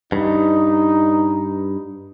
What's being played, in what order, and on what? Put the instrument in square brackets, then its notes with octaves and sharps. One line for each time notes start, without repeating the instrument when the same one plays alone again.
[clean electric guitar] G2 [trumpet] D#4